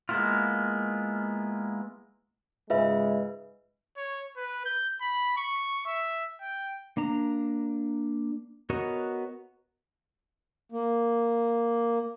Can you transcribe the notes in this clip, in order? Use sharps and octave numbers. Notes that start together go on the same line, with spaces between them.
G#3 A#3 B3 E4 F4
G#2 C#3 G#3 F4 B4 E5
C#5
B4
G6
B5
C#6
E5
G5
A#3 D4 A#5
B3 F#4 A#4 C#5 D#5
A#3